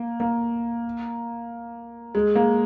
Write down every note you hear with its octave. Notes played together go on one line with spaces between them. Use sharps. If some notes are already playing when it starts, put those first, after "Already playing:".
Already playing: A#3
A#3
G#3
A#3